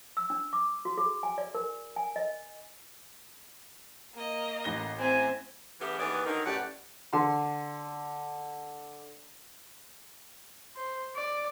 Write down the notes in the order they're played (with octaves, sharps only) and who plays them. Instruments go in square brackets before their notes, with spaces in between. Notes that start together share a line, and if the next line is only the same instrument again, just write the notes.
[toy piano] E6
D4
D6
F#4
G#4
G#5
D5
A#4
G#5
D#5
[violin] A#3 D#5
[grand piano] A1 A#6 G7
[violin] C4 E5 [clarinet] G#5
[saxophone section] C#3 E3 A3 B3 G4
D#2 E3 B3 G#4 D5
D3 D#3 F#3 D#4 A#4
F#2 A2 G4 B4 D5 F#5
[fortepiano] D3 C6
[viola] C5
D5